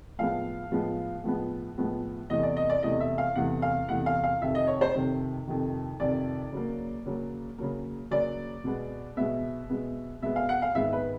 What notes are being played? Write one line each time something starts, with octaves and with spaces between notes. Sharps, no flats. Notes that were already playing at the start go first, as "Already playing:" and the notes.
A2 F3 G#3 B3 F5
A2 F3 G#3 B3
A2 F3 G#3 B3
A2 F3 G#3 B3
E2 C3 E3 A3 D#5
D5
D#5
D5
E2 C3 E3 A3 D#5
E5
F5
E2 C3 E3 A3 F#5
F5
E2 C3 E3 A3 F#5
F5
F5
F2 C3 D#3 E5
D#5
C#5
C5
F2 C3 D#3
F2 C3 D#3
F2 C3 D#3 D5
C#3 F#3 A#3
C#3 F#3 A#3
C#3 F#3 A#3
C#3 F#3 A#3 D5
B2 G#3 B3
B2 G#3 B3 E5
B2 G#3 B3
B2 G#3 B3 E5
F5
F#5
F5
G#2 D#3 G#3 B3 E5
B4